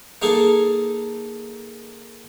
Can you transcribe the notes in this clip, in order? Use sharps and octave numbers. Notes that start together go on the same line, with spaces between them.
A#3 D#4 G#4 A4